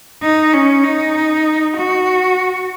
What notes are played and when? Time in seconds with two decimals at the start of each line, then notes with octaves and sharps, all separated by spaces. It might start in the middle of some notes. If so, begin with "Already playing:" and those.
0.22 D#4
0.53 C#4
0.83 D#4
1.77 F#4